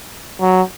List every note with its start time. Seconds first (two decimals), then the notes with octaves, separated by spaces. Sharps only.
0.40 F#3